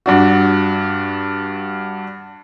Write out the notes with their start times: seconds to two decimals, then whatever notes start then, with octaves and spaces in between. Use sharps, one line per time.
0.06 G2 D4 F#4